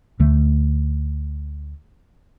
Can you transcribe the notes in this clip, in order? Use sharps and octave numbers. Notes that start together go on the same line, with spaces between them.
D2 D3 A3